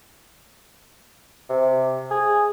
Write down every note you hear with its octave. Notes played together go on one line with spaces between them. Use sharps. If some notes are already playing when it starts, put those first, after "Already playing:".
C3
G#4